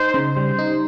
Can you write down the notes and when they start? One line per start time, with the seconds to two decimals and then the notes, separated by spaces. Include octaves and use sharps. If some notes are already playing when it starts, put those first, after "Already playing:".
Already playing: D#4 C5
0.14 C#3
0.37 G3 C5
0.59 D#4